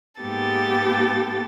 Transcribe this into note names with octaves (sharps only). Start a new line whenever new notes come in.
G#2 A#3 B3 G4 A4 A6